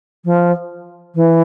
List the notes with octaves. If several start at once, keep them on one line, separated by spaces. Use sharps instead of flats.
F3
E3